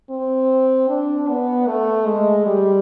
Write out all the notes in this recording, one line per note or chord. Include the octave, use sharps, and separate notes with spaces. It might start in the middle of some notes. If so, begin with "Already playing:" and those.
C4
D4
B3
A3
G#3
G3